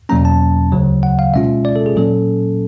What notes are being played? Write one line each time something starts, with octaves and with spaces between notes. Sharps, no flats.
E2 B2 F#3 A#3 C#4 A#5
A5
D2 C#3 F#3
F#5
F5
B2 G#3 C#4 F4 E5
D5
A4
G#4
A#2 F#3 A#3 C#4 A4